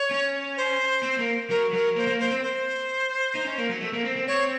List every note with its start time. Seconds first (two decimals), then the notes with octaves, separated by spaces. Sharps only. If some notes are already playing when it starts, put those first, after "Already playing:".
Already playing: C#5
0.11 C#4
0.57 C5
1.03 C4
1.19 A#3
1.50 F#3 A#4
1.73 F#3 A#4
1.96 A#3 C5
2.08 A#3
2.19 A#3 C5
2.31 C4
2.42 C5
3.35 D#4
3.46 C#4
3.58 A#3
3.69 F#3
3.81 A3
3.93 A#3
4.04 C4
4.16 C4
4.27 C4 C#5